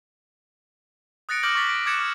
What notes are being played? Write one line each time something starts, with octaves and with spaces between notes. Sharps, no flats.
D#6 F#6 A6 A#6 C#7 D7
D6 F6 G6 A#6 F#7
C#6 D6 A6 B6 G7
D7
D6 F#6 G#6 A6 C#7 E7
F6